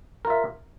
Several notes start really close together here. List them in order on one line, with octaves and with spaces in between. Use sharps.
A#4 F4 E5